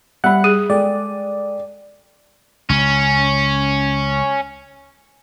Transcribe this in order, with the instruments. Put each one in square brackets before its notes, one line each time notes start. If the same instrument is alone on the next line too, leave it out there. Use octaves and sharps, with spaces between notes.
[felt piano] G3 B5 [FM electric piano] E5 F#5 F#6
[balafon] G#4
[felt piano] G#3 A4 G5 [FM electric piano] D5
[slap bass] C#2 [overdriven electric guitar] C#4